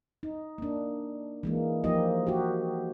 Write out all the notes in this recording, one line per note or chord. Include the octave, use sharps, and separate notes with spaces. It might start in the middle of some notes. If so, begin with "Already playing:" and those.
D#4
A#3 D4
E3 G#3 A#3
F3 A#3 D#4 G4 D#5
F#4 G4